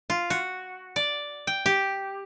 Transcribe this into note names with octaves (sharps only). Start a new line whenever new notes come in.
F4
F#4
D5
G5
G4